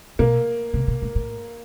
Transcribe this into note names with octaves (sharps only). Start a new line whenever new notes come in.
B2 A#3
C3
B2
A#2
A2